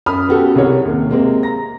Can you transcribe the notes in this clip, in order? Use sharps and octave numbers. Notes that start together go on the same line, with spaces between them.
F#2 B5 D#6 F6
B3 C#4 F#4 G4 A4
C2 G3 G#4 A#4 C#5 F#5
D#2 C3
C3 G#3 A#3 C4
A#5 A#6